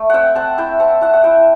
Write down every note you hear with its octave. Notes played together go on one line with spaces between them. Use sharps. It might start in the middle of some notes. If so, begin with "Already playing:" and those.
Already playing: A3
C4 E5 F#5 G5
C4 F#5 A5
E4 E5 G5
C4 F#5 A5
E4 F#5 A5
F#5
E4 E5 G5